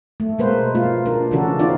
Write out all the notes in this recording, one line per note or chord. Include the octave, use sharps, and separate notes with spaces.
A3
B2 G#3 A#3 B4 C5
A#3 F4
D4 A#4
C#3 E3 C#4 D4 F#4 A4
C4 D4 D#4 F4 D5